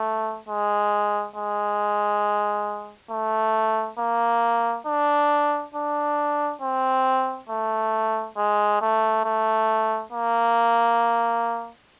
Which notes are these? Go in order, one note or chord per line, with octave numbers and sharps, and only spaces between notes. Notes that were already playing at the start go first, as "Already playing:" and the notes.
Already playing: A3
G#3
G#3
A3
A#3
D4
D4
C4
A3
G#3
A3
A3
A#3